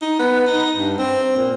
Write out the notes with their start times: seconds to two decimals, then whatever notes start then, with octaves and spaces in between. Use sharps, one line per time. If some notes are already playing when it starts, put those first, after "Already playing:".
0.02 D#4
0.19 B3
0.47 D#4
0.77 G2
0.98 C4
1.37 A#2